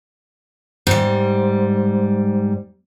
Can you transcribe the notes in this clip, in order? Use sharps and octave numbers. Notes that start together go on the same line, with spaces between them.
G#2 G3